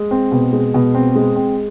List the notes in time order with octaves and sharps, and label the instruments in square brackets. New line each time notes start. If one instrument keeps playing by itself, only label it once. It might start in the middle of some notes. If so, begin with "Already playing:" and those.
Already playing: [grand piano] G#3
C4
B2
G#3
B2
C4
G#3
C4